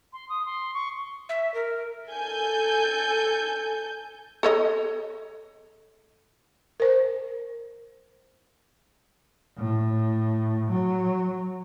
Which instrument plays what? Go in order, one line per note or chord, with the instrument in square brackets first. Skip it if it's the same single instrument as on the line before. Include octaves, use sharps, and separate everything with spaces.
[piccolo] C6
D#6
C6
C#6
[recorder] E5
A#4
[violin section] A4 G#5 G6
[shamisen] A4 C#5 D#5
[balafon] A#4 C5
[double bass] A2
F#3